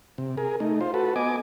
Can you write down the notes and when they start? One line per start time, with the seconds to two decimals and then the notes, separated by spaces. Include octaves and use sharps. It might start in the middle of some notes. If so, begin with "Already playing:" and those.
0.18 C3
0.37 G#4 A#4
0.60 A3 D#4
0.81 F4 C5
0.94 F#4 A4 B4
1.16 B3 D#5 G#5 D6